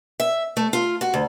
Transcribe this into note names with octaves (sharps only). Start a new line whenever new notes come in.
E5
A3
F4
F#4
D2